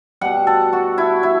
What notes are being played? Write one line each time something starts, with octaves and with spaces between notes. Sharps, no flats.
B2 G3 F#5
A4
F#4
E4
E4